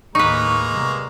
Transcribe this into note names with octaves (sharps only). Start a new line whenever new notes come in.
D#2 A2 G#3 A#3 D#4 B4 A#5 C#6
C3 G3 B3